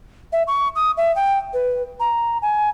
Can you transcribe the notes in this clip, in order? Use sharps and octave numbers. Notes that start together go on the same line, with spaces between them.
E5
C#6
D#6
E5
G5
B4
A#5
G#5